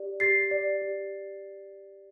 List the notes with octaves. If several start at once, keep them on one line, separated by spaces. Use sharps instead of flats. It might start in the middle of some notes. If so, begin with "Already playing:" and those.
Already playing: G4 D5
G4 A6 C7
D5
G4